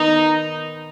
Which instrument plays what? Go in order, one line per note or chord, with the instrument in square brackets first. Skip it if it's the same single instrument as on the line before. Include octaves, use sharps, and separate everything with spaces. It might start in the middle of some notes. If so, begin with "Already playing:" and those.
Already playing: [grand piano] D#3 B3 [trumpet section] D#4